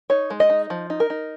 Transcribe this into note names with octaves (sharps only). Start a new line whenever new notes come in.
D#4 C#5
G#3
D#5
D#4
F3
D#4
A#4
D#4